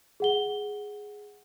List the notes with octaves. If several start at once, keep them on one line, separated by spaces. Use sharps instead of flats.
G#4 F#5 G7